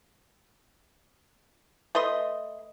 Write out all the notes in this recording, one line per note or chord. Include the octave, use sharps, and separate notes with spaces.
A3 B4 D#5 C6